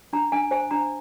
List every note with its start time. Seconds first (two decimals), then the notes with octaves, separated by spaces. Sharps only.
0.13 D4 A#5
0.32 D4 G#5
0.51 C5 G#5
0.71 D4 A#5